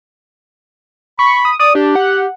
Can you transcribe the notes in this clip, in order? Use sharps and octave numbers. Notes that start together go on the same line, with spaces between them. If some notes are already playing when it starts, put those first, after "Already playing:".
B5 C#6
D#6
D5 D#6
D4 G4
F#5